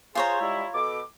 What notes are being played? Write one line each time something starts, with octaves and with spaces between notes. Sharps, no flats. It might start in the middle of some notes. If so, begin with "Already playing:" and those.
F4 G#4 C5 C#5 A#5
G3 G#3 E4
B2 A4 D6